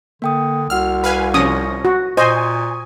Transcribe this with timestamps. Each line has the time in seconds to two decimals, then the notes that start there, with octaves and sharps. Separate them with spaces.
0.22 D3 A#3 G5 D#6
0.70 C2 F#4 F#5 E6 F6
1.04 B4 F5 G#5
1.34 C3 F3 C#4 C#6 D#6 A#6
1.85 F#4
2.17 A#2 C5 D#5 G#5 C#6 D#6